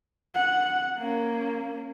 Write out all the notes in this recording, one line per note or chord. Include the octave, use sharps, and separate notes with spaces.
F#5
A#3 C#4